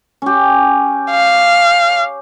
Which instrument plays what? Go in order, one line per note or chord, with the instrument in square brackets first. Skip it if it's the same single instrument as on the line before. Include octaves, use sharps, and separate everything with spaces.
[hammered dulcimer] C#4 G4
[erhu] F5